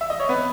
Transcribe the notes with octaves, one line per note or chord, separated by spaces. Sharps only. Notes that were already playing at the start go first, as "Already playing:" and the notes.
E5
D#5
C#5
B3 B4